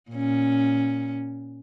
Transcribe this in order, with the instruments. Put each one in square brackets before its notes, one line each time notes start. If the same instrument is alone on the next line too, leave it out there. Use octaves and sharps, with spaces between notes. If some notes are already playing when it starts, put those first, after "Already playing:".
[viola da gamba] A#2 C#4